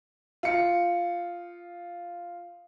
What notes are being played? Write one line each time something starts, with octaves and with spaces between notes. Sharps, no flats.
F4 C#7